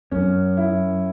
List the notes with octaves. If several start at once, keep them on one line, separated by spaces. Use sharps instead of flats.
F#2 C#4
E4